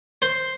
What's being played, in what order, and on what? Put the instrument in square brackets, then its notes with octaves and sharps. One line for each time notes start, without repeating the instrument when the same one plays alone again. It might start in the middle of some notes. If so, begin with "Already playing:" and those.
[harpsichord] C5